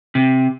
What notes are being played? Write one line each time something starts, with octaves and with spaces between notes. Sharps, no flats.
C3